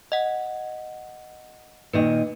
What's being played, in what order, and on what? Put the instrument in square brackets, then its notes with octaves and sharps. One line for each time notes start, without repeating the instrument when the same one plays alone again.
[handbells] D#5 F#5
[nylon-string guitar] A#2 D#3 D#5 [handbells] B4